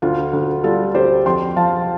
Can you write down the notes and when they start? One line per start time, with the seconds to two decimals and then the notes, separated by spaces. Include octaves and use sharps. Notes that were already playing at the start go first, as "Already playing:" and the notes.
0.02 D2 F4
0.33 D2
0.64 G3 F4 A4
0.94 D2 G4 C5
1.25 F2 G5 C6
1.56 F3 F5 A5